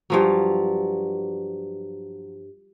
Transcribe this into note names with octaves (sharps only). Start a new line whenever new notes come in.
G2 F3 F#3